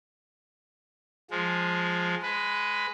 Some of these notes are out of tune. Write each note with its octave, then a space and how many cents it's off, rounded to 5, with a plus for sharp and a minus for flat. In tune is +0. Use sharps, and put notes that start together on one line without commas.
F3 +10 G#3 +0
G#3 +5 B4 +15